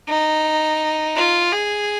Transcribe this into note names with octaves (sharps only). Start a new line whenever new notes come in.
D#4
F4
G#4